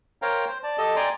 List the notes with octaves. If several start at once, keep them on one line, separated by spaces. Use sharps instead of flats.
A#4 C5 C#5 F5 G5 A#5
C5
D5 A5
G4 A4 D#5 A5
D5 G5 G#5 A#5 C6